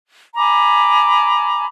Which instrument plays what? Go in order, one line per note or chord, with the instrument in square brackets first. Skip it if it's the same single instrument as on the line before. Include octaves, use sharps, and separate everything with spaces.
[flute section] G#5 A#5 B5 D6